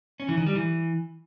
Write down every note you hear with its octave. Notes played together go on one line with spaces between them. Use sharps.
C#4
E3
D#3
G3
E3